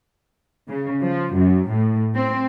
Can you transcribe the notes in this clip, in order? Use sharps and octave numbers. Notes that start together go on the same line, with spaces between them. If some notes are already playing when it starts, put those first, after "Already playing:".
C#3
F3
F#2
A2
C4